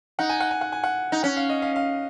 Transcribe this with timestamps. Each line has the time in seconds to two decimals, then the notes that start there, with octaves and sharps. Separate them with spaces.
0.19 D#4 F#5
0.30 G#5
0.41 F#5
0.51 G#5
0.61 F#5
0.72 G#5
0.84 F#5
1.12 D#4
1.23 C#4 F#5
1.37 F5
1.50 D#5
1.62 F5
1.76 F5